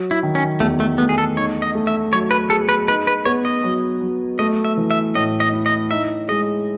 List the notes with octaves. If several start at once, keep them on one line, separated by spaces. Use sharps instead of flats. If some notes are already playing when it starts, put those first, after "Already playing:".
Already playing: F#3
E4
D#3
C#4
E2 A3
A3
A3 B3
G#4
A4
D#4 C#5
D#5
A3
E5
F#3 C#5
B4
G#4 A4
B4
D#4 B4
B4
B3 C#5
D#5
F#3
F#3
A3 D#5
E5
E3
E5
A2 D#5
D#5
E4
D#5
D#4 E5
G#3 D#5